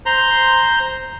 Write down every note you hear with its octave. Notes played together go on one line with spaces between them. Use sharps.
C5 A#5 C6